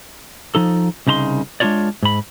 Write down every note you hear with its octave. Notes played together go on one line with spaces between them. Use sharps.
F3 D#4 A4
C2 C#3 D#4 A#5 C6
G#3 D4 D#4 F4 C#5 D5
G#2 B5